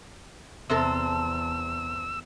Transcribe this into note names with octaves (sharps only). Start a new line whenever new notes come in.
E2 C3 C4 A4 E6